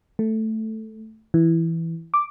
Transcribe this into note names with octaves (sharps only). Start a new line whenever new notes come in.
A3
E3
D6